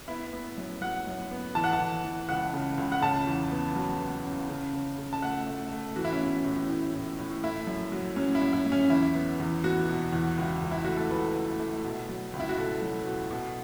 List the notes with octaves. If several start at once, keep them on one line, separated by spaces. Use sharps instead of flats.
B3 E4
B3
F#2
F#3 F#5
F#2
B3
E3 A5
F#5
A5
E3
E3
C#2 F#5
C#3
C#2
F#5
C#3 A5
E2
B3
F#3
B3
C#3
C#3
C#3
C#3
A5
A3 F#5
A3
A3
E3 F#4
E4
C#4
B3 E4
A2
A2
A2
A2
A3 E4
F#2
F#3
F#3 C#4
E4
F#2
E4
F#2
C#4
E2 E4
B3
E2
B3 F#4
B2
E2
C#2
C#2
E4
A3 F#4
A4
C#2 B4
A3
A3
B2
F#3
C#2
E4
F#4
B2 A4
F#3
B2
B2